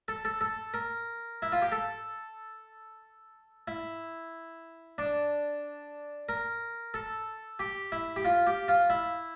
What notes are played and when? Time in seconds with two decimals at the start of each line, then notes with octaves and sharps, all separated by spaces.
0.08 A4
0.25 A4
0.41 A4
0.74 A#4
1.42 E4
1.52 F4
1.62 G4
1.72 A4
3.68 E4
4.98 D4
6.29 A#4
6.94 A4
7.59 G4
7.92 E4
8.16 G4
8.25 F4
8.47 G4
8.68 F4
8.90 E4